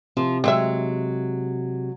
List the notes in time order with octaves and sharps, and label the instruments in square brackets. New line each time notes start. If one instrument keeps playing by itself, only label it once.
[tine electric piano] C3 [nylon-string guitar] F3
[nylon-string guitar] F#3 G#3 [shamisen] C4 E5